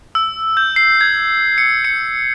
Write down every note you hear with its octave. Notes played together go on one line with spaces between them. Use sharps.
E6
G6
C7
G#6
C#7
C#7